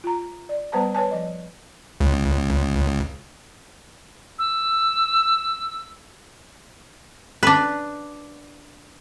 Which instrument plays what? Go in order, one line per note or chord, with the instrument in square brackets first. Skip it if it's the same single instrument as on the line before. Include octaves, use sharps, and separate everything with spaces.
[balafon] F4 A#5
D5
G3 B3 B4 C5 A5 A#5
B4 C#5 G#5 A5
F3 D#5
[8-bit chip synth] C#2
[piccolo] E6
[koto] D4 B4